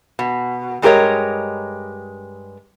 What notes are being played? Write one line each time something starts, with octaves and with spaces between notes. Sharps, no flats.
B2
G2 G#3 G4 A#4 C#5 D#5